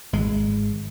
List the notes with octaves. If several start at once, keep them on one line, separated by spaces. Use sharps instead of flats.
G#1 G#3